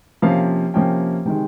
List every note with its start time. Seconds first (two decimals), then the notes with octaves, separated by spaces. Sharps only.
0.22 C3 F3 A#3 C#4 F5
0.74 C3 F3 A#3 C#4 G5
1.25 C3 D#3 G#3 G5